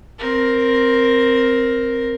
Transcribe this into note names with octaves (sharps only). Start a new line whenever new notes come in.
C4 A#4